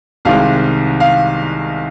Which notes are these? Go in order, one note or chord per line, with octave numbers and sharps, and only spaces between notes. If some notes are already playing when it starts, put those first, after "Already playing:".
C2 C3 D#3 G#3 F5
F5